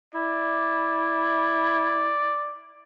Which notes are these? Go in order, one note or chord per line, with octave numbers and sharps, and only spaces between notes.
E4 D5